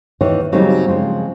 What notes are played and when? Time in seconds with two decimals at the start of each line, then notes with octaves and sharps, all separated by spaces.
0.21 D#2 D#3 E3 D#4 C#5
0.52 C#3 F#3 G3 A#3 C4 D#4
0.88 C#3 F3 G#3 C4